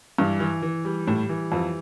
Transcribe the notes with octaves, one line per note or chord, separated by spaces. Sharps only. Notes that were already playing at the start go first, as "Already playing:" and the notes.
G2 E3
E3
E3
G3
A2 G3
E3
F2 E3